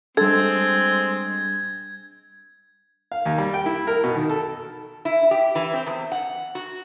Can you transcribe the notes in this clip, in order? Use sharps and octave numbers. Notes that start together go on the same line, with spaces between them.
G3 G#3 C4 D4 A4 G#6
F5
D#2
G3
G5
E4
A#4
B2
D#3
A4
E4
G4
E3
C4
E2
F#5
F#4